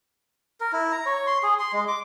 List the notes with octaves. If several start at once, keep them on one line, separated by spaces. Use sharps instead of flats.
A#4
E4
A#5
C#5
C6
G#4
C6
G#3
D6